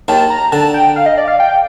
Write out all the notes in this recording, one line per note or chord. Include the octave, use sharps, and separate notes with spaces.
D#2 D#3 A5
A#5
D3 A5
G5
F5
D#5
D5
F5
G5